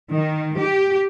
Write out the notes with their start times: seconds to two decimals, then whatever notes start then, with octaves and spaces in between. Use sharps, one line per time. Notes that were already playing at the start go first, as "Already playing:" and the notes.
0.12 D#3
0.58 G4